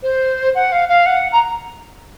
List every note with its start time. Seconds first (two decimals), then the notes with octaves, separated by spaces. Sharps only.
0.03 C5
0.55 F#5
0.72 F5
0.89 F5
1.06 F#5
1.32 A#5